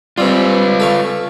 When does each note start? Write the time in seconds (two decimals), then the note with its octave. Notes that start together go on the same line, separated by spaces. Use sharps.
0.18 G3 C4 F4 B4
0.80 A4 F5 C#6